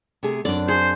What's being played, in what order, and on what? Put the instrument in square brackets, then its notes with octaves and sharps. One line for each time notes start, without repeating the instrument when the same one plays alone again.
[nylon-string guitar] C3 A3 G#4
[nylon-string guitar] F#2 C4 [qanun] D4 D5
[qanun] G#4 [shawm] C5